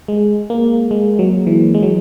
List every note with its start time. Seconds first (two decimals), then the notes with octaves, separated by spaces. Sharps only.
0.08 G#3
0.50 A#3
0.91 G#3
1.19 F#3
1.47 E3
1.74 G#3
1.83 F#3